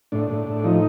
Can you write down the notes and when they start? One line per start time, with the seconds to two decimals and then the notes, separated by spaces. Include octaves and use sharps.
0.12 A2 D4
0.30 A2
0.47 A2
0.64 F3 D#4